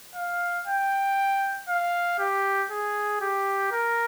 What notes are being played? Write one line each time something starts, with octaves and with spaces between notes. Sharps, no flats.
F5
G5
F5
G4
G#4
G4
A#4